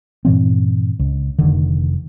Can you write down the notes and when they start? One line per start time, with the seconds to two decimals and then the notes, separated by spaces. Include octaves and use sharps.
0.25 G2 A#2 E3 C4
0.99 C#2
1.39 F1 D3 D#3